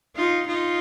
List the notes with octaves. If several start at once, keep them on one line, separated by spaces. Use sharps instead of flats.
D#4 F4
D#4 F4